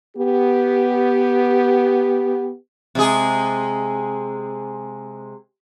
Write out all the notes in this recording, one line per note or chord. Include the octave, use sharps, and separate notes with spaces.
B3 G4
C3 G#3 G#4